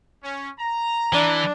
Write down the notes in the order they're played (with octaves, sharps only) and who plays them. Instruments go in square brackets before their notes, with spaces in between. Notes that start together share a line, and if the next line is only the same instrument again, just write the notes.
[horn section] C#4
A#5
[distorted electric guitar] E3 [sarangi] D4